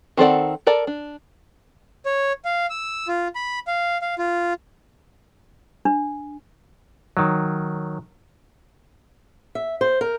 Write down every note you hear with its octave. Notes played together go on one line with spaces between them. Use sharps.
D#3 C4 A4 D5 F#5
A4 A#4 D5 A5
D4
C#5
F5
E6
F4
B5
F5
F5
F4
D4
D#3 F#3
E5
C5
A#4